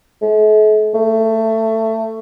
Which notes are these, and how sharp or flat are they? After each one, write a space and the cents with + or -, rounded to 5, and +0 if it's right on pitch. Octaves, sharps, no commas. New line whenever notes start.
A3 -45
A3 +20